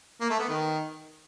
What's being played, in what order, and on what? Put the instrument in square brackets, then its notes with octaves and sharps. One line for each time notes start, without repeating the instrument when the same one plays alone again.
[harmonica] A#3
A3
B3
D#3